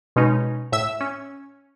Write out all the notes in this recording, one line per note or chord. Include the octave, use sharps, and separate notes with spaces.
B2 G#3 C#4 D#4
A2 E5 E6
C#4